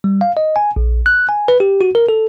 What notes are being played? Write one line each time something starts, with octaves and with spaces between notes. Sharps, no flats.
G3
F5
D#5
G#5
A#1
F#6
G#5
B4
G4
F#4
A#4
A4